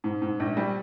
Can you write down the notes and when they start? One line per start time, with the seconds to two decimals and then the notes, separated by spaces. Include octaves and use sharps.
0.04 G#2
0.22 G#2
0.40 A#1
0.57 G3